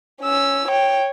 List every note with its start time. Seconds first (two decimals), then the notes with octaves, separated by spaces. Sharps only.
0.22 C#4 E6
0.68 C#5 G5